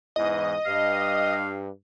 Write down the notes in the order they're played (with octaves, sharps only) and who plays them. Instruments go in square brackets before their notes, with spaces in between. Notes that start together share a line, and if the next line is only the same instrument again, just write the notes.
[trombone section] E2 G#2 E3 [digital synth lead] D#5
[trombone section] G2 [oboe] F5